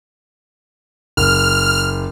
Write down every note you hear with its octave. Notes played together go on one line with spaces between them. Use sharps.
F#1 F6